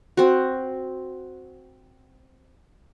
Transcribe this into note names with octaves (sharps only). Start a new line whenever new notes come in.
C4 F#4